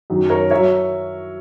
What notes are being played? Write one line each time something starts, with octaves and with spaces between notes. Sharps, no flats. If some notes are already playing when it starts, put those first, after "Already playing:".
F#2 D#3 F#3
A#4 C#5
F#3 C#5 E5